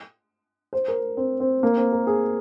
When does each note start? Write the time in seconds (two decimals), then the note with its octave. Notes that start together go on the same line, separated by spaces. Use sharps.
0.73 C5
0.88 A#4
1.17 C4
1.40 C4
1.63 A#3
1.77 C4
1.92 A#4
2.07 G#4